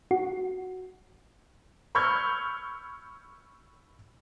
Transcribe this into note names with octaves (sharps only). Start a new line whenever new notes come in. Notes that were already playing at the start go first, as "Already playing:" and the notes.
F#4
B5 C#6 E6 F6 G6 G#6